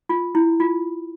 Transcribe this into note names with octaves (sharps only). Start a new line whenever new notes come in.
F4
E4
F4